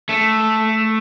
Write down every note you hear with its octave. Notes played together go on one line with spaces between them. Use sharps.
A3